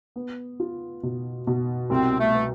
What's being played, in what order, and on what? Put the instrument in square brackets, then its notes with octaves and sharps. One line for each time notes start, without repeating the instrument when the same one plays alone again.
[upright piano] B3
F4
B2
B2
[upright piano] C2 [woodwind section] C4
[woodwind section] A3
[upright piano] B3